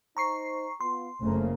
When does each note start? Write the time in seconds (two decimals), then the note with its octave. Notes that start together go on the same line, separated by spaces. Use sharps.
0.17 D#4 C5 A#5 C#6 C7
0.81 B3 F4 C6
1.21 F#1 F2 C#3 A3 A#3 C4 C5